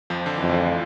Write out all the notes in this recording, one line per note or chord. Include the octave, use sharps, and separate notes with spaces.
F2 F3
D3
F2 E3
D2 D3